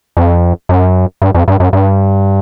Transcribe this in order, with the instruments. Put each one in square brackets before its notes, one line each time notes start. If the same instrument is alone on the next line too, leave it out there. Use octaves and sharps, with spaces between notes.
[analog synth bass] F2
F#2
G2
F2
G2
F#2
G2